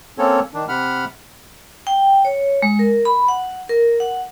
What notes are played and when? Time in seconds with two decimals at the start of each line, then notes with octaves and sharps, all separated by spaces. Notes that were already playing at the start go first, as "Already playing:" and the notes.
0.18 A#3 C4 C#4 A4 C#5
0.54 D#3 D4
0.68 C3 F#5 B5 F6
1.87 G5
2.25 C#5
2.62 G#3
2.79 A#4
3.05 B5
3.28 F#5
3.69 A#4
4.00 F#5